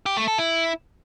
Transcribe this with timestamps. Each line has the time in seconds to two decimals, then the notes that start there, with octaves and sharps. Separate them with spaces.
0.06 G4
0.17 A3
0.28 A4
0.38 E4